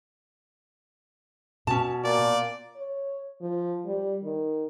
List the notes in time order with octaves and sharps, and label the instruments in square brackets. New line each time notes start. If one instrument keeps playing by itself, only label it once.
[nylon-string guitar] B2 [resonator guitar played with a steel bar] C#4 A5
[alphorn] A#2 [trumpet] D5
[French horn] C#5
F3
G3
D#3